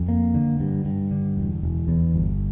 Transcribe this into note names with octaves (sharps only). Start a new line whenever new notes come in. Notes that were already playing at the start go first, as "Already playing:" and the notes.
Already playing: F2
A#3
D3
G2
G2
D3
E1
E1
E2
G1